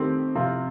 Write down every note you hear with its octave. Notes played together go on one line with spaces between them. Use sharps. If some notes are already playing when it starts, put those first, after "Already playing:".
Already playing: D#3 A3 C4 G4
C3 F3 C4 F4